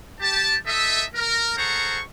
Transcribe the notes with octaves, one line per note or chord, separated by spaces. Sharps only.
G4 A5
D#4 A4 D#5 E5
A#4
G#4 A4 C5 F#5 A#5 C#6